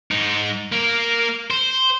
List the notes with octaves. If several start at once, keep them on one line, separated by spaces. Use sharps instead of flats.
G#2 D#4
A#3 A#4
C5